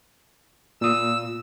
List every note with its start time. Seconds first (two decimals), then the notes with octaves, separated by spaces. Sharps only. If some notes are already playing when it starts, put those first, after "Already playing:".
0.81 A#2 D#6 E6